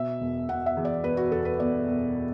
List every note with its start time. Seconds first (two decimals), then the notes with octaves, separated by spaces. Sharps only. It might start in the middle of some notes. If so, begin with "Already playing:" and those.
Already playing: B2 E5
0.20 E1
0.49 B2 F#5
0.66 E5
0.77 E2
0.85 D5
1.03 E1 B4
1.17 F#4
1.32 E1 A4
1.45 B4
1.59 E1 D5
1.88 E1